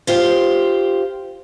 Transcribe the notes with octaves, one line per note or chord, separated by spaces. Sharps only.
F4 G4 C5